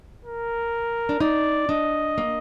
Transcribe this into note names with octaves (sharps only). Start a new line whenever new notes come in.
A#4
D4
D#4 D5
D4 D#5
A#3